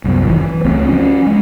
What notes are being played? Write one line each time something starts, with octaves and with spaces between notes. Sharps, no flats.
C2 F#2 B3
G#1 F#2 A#2 E3
E3
C#2 A3 C4
F3 C#4
G#3 C#4